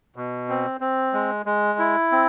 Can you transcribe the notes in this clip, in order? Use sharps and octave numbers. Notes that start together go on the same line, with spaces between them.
B2
C4
C4
G#3
G#3
E4
C4